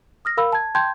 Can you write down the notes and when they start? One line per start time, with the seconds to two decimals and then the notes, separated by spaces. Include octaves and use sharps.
0.25 D#6 F6 A#6
0.37 A#4 F5 B5 E6
0.52 A5 G#6
0.75 G5 A5 C6 G6 G#6